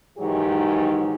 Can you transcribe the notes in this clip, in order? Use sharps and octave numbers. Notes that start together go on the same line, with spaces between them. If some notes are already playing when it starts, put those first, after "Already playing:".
G#2 D#3 E3 F#3 G4 G#4